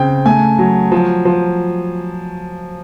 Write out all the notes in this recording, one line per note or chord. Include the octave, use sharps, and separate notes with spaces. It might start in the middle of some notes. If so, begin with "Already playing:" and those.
Already playing: C#3 C4 G5
A3 G#5
F#3
F3
F3